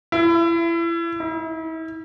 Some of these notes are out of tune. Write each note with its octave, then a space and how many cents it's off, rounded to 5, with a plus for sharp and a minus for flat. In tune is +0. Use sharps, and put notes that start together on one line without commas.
E4 +30
E4 -40